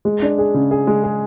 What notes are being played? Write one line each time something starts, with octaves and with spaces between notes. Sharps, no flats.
G#3
D4
G#4
C#3
G#4
G#3
G#4